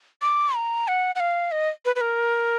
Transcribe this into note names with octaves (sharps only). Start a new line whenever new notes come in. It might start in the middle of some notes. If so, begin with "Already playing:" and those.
D6
A#5
F#5
F#5
F5
D#5
B4
B4
A#4